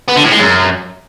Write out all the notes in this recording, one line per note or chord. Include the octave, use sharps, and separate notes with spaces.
B3
D3
A2
G#3
F#2